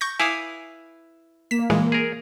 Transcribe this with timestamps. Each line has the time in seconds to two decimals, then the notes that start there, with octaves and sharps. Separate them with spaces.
0.01 C#6 G6 A#6
0.20 E4 B4 F5 G#5 D6 D#6
1.51 A#3 B6 E7
1.70 A#2 E3 G#3
1.92 G#4 A#4